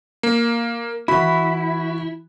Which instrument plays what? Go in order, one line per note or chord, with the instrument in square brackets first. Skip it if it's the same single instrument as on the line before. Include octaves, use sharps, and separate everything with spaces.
[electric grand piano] A#3
[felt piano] E3 F#4 [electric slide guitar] E4 [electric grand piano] B5